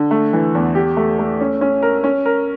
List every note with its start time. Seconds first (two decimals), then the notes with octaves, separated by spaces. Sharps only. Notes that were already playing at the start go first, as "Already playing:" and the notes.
Already playing: D3
0.11 A3
0.33 E3
0.55 E2
0.75 G4
0.97 A3
1.19 A3
1.41 C#4
1.61 C#4
1.82 A#4
2.04 C#4
2.26 A#4